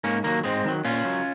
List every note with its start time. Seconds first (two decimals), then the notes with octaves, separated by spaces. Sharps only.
0.04 G#2 A#3 C#4
0.24 D#3 F#3 A#3
0.44 G#2 G#3 C4
0.65 D#3 F#3
0.85 A#2 C#4 F4
1.05 F#3